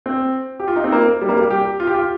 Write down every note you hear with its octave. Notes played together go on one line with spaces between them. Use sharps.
C4
G4
F4
D#4
C4
A#3
G3
A#3
G3
G4
F4
G4
F4